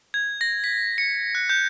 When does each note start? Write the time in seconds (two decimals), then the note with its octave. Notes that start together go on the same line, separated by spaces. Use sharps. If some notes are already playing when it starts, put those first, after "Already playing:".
0.14 G#6
0.41 A#6
0.64 B6
0.98 C#7
1.35 F#6
1.49 G6